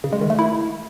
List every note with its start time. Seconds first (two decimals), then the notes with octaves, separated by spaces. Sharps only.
0.04 C#3
0.13 G#3
0.21 D#3
0.30 A3
0.39 E4